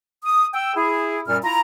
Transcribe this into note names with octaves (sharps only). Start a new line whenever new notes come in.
D#6
G5 E6
E4 G#4
F#2 A#2 G3 F6
E4 F4 A#5